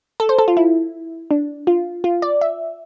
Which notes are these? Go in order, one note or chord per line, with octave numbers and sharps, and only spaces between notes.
A4
C5
A4
F4
E4
D4
F4
F4
D5
E5